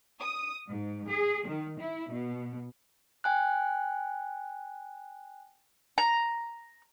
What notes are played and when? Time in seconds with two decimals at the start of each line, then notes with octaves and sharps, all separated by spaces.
0.19 D#6
0.69 G#2
1.09 G#4
1.46 D#3
1.80 E4
2.11 B2
3.24 G5 G#5 F#6
5.98 A#5